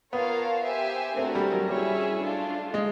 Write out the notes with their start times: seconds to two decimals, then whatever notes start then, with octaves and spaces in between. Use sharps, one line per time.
0.13 B3 F4 A#4 C#5 F5 A5
0.65 G4 C5 E5 G#5
1.17 A3 C4 D4 F#4 A#4
1.35 G3
1.52 F#3
1.69 G3 C#4 E4 G#4 C#5 E5
2.22 A3 D4 F4
2.74 G#3